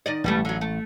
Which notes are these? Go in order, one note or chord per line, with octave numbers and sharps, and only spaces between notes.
D#3 D5 D#5
A1 B2 G3 A3
D3 F#3
A3